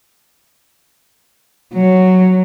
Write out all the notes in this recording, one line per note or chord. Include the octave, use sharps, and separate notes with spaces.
F#3